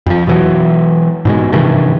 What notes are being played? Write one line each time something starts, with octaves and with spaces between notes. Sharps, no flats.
F2 F3
B2 E3 F#3
G#2 B2 G#3
G2 C3 D#3 E3